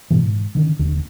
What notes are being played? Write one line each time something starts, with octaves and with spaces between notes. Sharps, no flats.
G#2 B2 E3
G#2
D3 D#3 C#4
D#1 D#2 D3